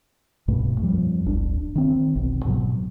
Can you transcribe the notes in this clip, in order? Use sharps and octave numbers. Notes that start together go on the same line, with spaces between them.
C2 G2 B2 A3
F2 F3 G3
D1 G1 C#4 D4
D#3 C4
F1 B1
G#2 B2 D3 F#3